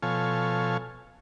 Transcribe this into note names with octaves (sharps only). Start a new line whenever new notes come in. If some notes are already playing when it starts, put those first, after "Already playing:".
B2 F3 A4 C#5 F5 G#5